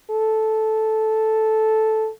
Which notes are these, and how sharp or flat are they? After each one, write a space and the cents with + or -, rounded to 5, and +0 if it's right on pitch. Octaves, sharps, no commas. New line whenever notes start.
A4 -10